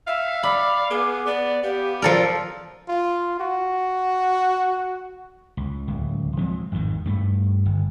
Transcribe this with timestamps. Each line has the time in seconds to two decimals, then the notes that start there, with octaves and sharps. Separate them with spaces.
0.07 E5 F5
0.43 D5 B5 D6
0.90 B3 G#4
1.27 B3 D5
1.63 B3 G4 F5
2.02 F3 A4 A#4 D5
2.88 F4
3.40 F#4
5.57 C#2
5.88 D1 C#2
6.37 F3 G#3 C4
6.72 G#1 F2 G#2 D#3
7.06 G2 A3
7.66 G1